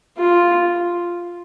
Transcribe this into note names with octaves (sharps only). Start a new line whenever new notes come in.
F4